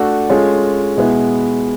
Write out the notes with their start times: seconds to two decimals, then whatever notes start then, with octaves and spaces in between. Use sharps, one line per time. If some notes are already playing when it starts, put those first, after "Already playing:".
Already playing: A3 D4 F#4 A4
0.29 G#3 C#4 F4 A4 C#5
0.97 B2 G#3 B3 E4